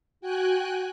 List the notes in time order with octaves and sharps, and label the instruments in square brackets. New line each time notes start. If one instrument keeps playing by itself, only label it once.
[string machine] F#4 G5 G#5 F#6